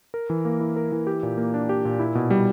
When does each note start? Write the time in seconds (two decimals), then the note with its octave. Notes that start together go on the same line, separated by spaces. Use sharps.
0.14 A#4
0.30 E3
0.45 A#3
0.60 E4
0.76 A#4
0.92 E3
1.07 G4
1.23 A#2
1.37 A#3
1.54 D4
1.69 G4
1.85 A#2
1.99 E4
2.15 B2
2.30 G3